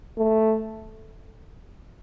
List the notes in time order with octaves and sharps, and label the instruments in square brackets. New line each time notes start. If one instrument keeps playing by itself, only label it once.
[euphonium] A3